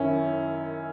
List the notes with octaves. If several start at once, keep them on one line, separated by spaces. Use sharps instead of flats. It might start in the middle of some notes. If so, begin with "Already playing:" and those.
Already playing: F#2 D#3 C#4 E4